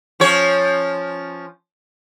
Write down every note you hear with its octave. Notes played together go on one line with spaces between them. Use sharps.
F3 C#4 C#5